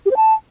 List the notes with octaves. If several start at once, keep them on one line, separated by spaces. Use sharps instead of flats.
G4
C5
A5